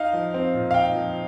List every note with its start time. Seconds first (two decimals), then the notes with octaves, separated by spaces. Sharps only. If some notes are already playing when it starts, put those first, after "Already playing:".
Already playing: D#4 F5
0.13 F3
0.34 C4
0.54 A#2
0.71 F5
0.74 D#4 G5
0.95 F3